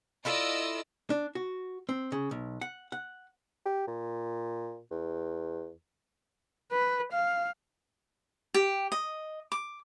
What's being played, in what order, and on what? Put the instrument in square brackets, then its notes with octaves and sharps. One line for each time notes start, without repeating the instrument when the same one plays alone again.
[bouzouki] E4 F4 A4 [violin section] D5 D#5 E6
[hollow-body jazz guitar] D4
F#4
C4
C#3
B1
F#5
F#5
[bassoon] G4
A#2
E2
[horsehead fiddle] B4
F5
[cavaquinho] G4
D#5
D6